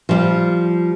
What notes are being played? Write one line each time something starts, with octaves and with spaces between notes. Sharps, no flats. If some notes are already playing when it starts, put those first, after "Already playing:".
F3 G3